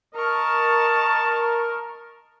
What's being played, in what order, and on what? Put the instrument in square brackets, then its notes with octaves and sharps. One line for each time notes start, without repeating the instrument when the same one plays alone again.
[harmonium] A#4 [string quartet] D#5 C#6 F6 [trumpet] A5